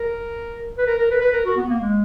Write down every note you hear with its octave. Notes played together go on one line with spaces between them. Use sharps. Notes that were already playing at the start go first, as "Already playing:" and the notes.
Already playing: A#4
B4
A#4
A#4
B4
B4
A#4
F#4
B3
A#3
G#3